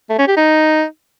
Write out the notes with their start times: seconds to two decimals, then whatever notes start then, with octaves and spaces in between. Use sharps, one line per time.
0.09 A3
0.18 C#4
0.27 G4
0.37 D#4